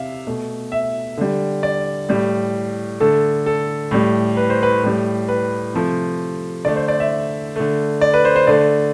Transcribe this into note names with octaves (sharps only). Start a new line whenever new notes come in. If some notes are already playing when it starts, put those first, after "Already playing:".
Already playing: C3 E5 F5
B2 A3
E5
D3 G3
D5
A2 G3
D3 A3 A4
A4
A2 G3
B4
C5
B4
A2 G3
B4
C3 F3 A3
D3 A3 D5
C5
D5
E5
D3 A3
D5
B4
C5
C5
D3 A3 D5